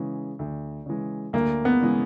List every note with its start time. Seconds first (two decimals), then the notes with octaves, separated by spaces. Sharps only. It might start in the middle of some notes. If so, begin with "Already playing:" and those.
Already playing: C#3 E3 G#3
0.39 D2
0.86 C#3 E3 G#3
1.33 D2 A#3
1.65 B3
1.81 C#3 E3 G#3